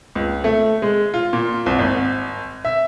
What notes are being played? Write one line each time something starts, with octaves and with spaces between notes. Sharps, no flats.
C#2
A3
G#3
F4
A#2
C2
G#1
E5